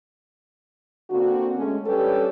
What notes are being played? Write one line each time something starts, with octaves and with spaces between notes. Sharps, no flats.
D3 A#3 C4 D4 F#4
G#3 A3 C#4
G3 C#4 D4 G4 A4 B4